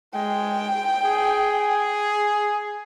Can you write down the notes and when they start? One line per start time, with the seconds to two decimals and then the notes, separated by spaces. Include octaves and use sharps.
0.14 G#3 G5
1.05 G#4